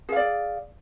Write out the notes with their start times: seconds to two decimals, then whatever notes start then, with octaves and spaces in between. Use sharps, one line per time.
0.09 G#4
0.12 F5
0.16 D5